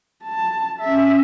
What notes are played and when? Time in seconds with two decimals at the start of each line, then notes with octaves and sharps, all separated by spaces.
0.24 A5
0.80 C#4 E5